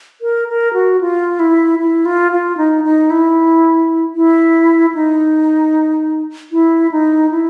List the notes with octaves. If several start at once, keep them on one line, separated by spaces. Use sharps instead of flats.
A#4
A#4
F#4
F4
E4
E4
F4
F4
D#4
D#4
E4
E4
D#4
E4
D#4
E4